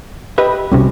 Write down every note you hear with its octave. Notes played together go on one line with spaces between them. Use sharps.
G4 B4 D#5 E5
C2 C3 G3 C#4 F#4